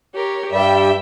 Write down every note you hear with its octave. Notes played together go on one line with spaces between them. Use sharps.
G4 A#4 C#5
G2 G3 E5 G5